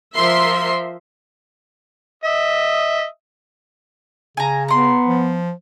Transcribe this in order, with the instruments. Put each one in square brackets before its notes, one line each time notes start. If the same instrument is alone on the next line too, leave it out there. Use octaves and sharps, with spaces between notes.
[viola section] F3 A#4 E5 C6
[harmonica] D#5 E5
[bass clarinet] C#3 [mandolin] G#5 A#5
[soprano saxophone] B3 [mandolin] A#5 C6
[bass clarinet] F3